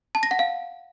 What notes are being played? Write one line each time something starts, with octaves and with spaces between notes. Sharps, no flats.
A5
A#6
F#5
F5